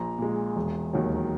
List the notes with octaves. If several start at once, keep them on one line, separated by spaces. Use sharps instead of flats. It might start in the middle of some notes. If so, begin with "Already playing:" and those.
Already playing: A#1 A#5
A#2 G#3
E1
D#2 D#3 F#3